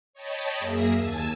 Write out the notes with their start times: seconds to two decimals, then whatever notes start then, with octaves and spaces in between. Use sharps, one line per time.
0.13 C#5 D#5 G5 A5 B5
0.59 F#2 A#3 G#4 E5 A#6
0.96 D#2 G#5 A5 E6